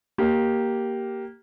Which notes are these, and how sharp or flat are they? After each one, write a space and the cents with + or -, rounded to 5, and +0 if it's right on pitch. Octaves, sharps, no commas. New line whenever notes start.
A#3 +0 G4 -10